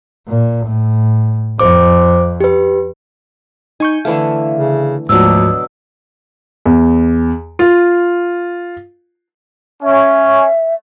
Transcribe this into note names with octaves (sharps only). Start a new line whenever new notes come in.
A#2
A2
F2 C5 D6
G4 B4
D#4 G#5 C#6 G6
D3 E3 A3 F5
C#3
D2 G#2 B2 F3 F#3 D4 E6
E2
F4
C#4 E5